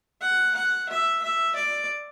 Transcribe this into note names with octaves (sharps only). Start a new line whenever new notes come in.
F#5
F#5
E5
E5
D5